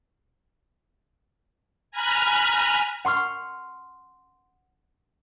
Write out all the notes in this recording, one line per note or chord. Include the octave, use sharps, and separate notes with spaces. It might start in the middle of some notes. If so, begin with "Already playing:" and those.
G#5 A#5 B5 F6 F#6 G#6
F#5 C6 C#6 F6